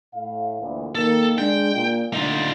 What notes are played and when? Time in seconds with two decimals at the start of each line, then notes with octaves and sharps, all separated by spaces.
0.15 A2 F5
0.61 D2 A#2 E3
0.95 D#3 A#3 A4
1.38 G#3 D4 G5
1.75 A#2
2.14 D3 A3 D#4 F4